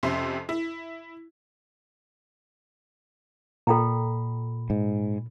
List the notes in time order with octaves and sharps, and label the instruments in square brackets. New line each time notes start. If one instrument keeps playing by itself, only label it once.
[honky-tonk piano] F2 C3 C#4 E5 C6
E4
[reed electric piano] A#2 B5 [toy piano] A4 G5 A#5
[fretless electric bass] G#2